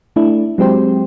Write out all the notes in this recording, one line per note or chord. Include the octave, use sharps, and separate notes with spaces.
A3 D4 E4
F#3 G#3 C4 G4 C5